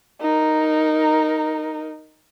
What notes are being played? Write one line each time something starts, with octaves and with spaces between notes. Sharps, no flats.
D#4 A#4